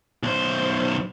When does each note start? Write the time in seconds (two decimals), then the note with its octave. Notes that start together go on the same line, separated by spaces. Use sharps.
0.23 B1 C5